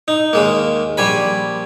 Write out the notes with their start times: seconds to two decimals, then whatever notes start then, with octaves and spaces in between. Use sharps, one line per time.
0.08 D#4
0.33 D#2 G#3 A#3
0.97 A#1 G3 G#5 B5